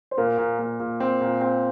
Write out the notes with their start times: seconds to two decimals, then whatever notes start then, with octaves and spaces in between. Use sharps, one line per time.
0.11 C5
0.17 A#2 A#3 A#4
0.38 A#2
0.59 A#2
0.80 A#2
1.00 C4
1.21 A#2
1.41 C4